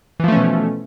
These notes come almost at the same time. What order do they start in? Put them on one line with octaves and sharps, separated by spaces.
E3 F3 A3 C#4 B2